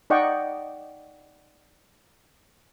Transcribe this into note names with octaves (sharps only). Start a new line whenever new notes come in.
D#4 D5 D#5 F#5 G5 C#6